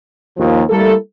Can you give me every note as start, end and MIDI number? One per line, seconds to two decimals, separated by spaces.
0.37 0.63 39
0.37 0.63 53
0.69 0.94 55
0.69 0.94 57
0.69 0.94 58
0.69 0.94 64
0.69 0.94 69